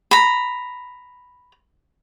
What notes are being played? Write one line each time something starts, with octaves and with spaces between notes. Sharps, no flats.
A#5 B5